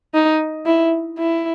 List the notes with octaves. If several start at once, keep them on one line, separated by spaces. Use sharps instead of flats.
D#4
E4
E4